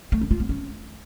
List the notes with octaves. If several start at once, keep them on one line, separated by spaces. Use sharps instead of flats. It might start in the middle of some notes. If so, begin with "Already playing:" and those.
A3
C#4
F4
B3
C#4